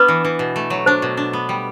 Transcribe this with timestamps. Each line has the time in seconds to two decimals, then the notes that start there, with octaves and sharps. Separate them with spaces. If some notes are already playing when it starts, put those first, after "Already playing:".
Already playing: B3 D4 B4
0.08 E3
0.24 E3
0.39 B2
0.56 A3
0.70 F#3
0.86 D4 C5
1.02 B2
1.17 D4
1.33 B3
1.49 G3